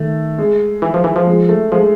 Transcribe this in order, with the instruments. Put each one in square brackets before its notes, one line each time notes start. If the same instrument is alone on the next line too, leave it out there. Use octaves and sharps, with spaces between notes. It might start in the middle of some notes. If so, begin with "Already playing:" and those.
Already playing: [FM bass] D#3 [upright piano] A3
[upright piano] G#3
[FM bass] E3
F3
E3
F3
[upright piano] G#3
A3
[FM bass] F3 [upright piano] G#3